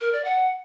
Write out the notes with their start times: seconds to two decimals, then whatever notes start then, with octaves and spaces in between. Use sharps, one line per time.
0.01 A#4
0.13 D5
0.24 F#5